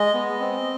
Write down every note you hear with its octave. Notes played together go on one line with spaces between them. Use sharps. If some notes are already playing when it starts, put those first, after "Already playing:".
Already playing: G#3 D#5
B3
C4